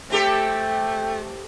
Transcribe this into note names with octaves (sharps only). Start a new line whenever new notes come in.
A3 C4 G4 A4 G5